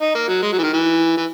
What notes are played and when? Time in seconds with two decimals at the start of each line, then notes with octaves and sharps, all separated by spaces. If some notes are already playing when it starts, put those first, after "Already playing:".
0.01 D#4
0.15 A#3
0.28 F#3
0.43 G#3
0.53 F#3
0.58 E3
0.63 D#3
0.73 E3
1.17 E3